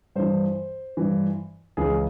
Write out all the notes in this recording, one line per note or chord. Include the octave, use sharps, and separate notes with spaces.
G2 E3 C5
G2 E3
C#2 C#3 E3 G#4